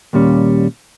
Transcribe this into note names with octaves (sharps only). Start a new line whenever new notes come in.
D#2 A#2 G3 C#4